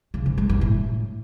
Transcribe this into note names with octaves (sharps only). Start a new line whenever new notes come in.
C#3
G#2
G#3
G2
A2